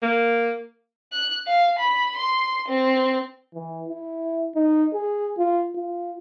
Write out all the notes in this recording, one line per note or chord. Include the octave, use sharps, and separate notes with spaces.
A#3
F#6
F5
B5
C6
C4
E3
E4
D#4
G#4
F4
F4